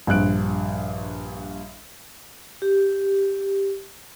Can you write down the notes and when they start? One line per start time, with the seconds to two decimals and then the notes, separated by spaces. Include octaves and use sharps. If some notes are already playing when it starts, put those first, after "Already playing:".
0.07 A#1 G2 F#6 D7
2.62 G4